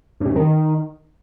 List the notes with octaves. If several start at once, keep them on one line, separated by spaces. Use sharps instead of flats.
G2
C3
F#2
D#3